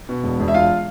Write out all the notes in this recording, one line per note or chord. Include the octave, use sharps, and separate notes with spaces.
B2
E1
E1
E5
E1 F4 F5